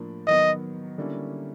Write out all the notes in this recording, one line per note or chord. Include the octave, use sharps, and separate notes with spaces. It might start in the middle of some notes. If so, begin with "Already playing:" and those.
Already playing: A2 F3 A#3 D4
D#3 F#3 B3 D#5
D3 G3 A#3 C#4 E4